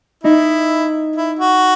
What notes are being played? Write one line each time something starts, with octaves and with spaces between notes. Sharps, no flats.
D#4 E4
E4
F#4